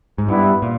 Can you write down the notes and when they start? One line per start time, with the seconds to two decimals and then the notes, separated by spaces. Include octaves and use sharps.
0.18 G#2
0.28 G2 G3 B3 E4
0.62 A#2